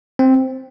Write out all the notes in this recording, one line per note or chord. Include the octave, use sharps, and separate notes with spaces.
C4